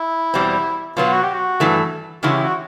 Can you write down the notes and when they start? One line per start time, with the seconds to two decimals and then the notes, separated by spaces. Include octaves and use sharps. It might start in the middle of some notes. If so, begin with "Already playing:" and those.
Already playing: E4
0.34 E2 B2 G3 C4
0.97 B2 F#3 B3 F4
1.13 F#4
1.23 G4
1.34 F#4
1.60 G2 E3 A3
2.23 C#3 E3 G#3 C#4 E4 F#4
2.33 G4
2.43 F#4